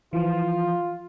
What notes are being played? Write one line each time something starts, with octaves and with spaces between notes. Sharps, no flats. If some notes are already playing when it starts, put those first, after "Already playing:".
E3 F3 F4